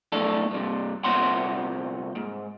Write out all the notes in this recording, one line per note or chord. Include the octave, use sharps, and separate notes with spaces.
B1 F2 A2 D4 A4
G2 C3
C2 A#2 C4 C#5 F#5 C6
G#2